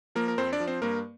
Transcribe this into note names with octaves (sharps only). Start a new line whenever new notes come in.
F3 A#3 A#4
A#4
F2 C4 C5
D4 D5
F3
C4 C5
G2 A#3 A#4